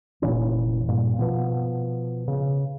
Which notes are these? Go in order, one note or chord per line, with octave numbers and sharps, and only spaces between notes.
F1 A#2 E3 C#4
G2 A#2
B2 F3 B3
C#3